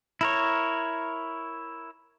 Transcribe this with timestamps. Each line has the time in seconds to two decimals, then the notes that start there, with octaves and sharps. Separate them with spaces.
0.21 E4 A#4 C#5